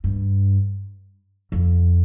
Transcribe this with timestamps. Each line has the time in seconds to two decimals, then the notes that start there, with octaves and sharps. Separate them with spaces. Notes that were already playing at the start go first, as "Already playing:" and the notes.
0.04 G2
1.52 F2